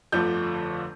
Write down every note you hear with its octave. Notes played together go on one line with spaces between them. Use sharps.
G1 F2 D3 F3 A3 G6